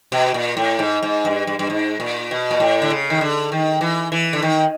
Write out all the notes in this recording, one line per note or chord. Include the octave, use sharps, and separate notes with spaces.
B2
A#2
A2
G#2
G#2
G2
G2
G2
G#2
A#2
B2
A#2
A2
D3
C#3
D#3
D3
D#3
E3
E3
D3
D#3